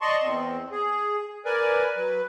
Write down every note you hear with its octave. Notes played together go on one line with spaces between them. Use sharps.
D5 D#5 A5 C6 C#6
E2 C4
G#4
A#4 B4 D5 G#5
F#3 B4